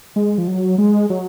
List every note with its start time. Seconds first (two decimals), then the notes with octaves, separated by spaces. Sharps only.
0.16 G#3
0.38 F3
0.47 F#3
0.78 G#3
1.10 F#3